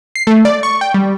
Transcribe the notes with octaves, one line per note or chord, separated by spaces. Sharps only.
C7
A3
D5
C#6
G5
G3